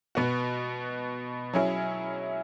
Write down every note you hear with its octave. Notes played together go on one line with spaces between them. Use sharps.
B2 B3 F#4
F#3 C#4 E4 G#4